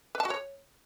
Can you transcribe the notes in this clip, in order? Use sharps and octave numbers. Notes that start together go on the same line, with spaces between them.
B4
A5
F#4
C#5